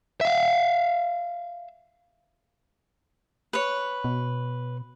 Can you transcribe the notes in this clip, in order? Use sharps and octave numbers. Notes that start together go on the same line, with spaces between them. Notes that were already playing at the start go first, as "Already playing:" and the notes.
E5 F5
B4 C#5
B2